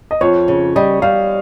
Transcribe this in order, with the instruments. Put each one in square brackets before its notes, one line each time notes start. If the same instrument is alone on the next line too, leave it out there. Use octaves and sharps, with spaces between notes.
[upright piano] D#5
[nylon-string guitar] F2 [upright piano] C#5
[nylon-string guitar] C#3
[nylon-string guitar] G3 [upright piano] D#5
[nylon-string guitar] G3 [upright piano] F5